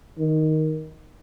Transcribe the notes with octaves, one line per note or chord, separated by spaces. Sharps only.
D#3